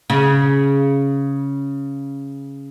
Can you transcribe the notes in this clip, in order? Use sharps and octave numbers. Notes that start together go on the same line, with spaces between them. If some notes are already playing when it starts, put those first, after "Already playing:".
C#3